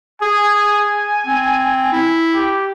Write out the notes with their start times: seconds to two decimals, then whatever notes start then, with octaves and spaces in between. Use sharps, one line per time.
0.22 G#4 G#5
1.27 C4
1.92 E4
2.35 G4